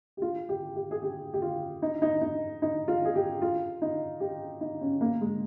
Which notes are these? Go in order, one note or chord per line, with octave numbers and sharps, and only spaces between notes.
G4
F4
G4
G4
G#4
G4
G4
F4
D#4
D#4
D#4
D#4
F4
G#4
G4
F4
D#4
G4
D#4
C#4
A#3
G#3